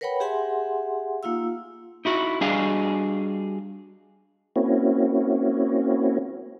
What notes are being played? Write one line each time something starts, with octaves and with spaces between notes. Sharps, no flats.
A#4 B4 C#5 F#5 G5 B5
G4 G#4 E5 F#5 G#5 C6
A#3 D#4 F4 F5 E6
D#4 E4 F#4
G3 D4 F#4 G#4 D#5 F5
A#3 C4 C#4 E4 F#4